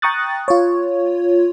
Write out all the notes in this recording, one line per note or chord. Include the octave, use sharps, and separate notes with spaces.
G5 A#5 C#6 D#6 F#6 A6
F4 C#5